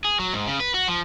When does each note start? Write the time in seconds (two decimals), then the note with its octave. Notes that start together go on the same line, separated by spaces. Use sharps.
0.04 G#4
0.19 F#3
0.33 G#2
0.47 C#3
0.60 B4
0.74 F#4
0.88 F3